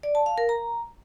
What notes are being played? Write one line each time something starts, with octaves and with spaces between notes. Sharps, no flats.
D5
A5
F5
A#4
A#5